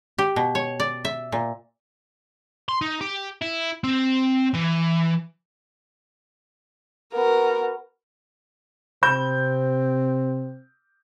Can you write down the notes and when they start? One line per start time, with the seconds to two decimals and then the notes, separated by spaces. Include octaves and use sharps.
0.18 G4
0.36 B2
0.55 C#5
0.80 D5
1.05 E5
1.32 A#2
2.69 C6
2.81 D#4
3.01 G4
3.42 E4
3.84 C4
4.55 E3
7.14 B3 F#4 A#4
9.03 C3 C4 B5 G6